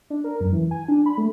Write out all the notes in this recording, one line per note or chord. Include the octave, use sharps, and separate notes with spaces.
D4
A#4
F#2
E3
G#5
D4
B5
A3